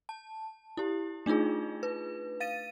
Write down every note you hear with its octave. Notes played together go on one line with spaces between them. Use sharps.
A5
E4 G4
A3 D4 D#4 F4 G#4
B4
F5 A6 D#7